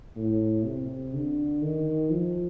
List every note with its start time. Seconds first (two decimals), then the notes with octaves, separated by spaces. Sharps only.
0.17 A2
0.65 C3
1.14 D3
1.62 D#3
2.11 F3